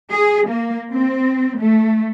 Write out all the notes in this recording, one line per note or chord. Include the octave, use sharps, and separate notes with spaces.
G#4
A#3
C4
A3